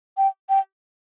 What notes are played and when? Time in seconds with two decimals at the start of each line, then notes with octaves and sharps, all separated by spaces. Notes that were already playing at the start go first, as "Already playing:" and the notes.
0.17 G5
0.49 G5